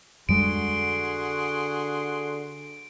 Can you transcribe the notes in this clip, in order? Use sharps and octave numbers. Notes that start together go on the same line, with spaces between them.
F2 D3 G3 G#3 F#4 G#4 C6 D7